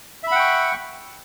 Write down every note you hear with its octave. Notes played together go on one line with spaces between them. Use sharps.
E5 F#5 G5 B5 C#6